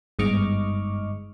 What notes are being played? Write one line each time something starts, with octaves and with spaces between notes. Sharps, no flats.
G1 G#2 D#5 C#6 D6 F6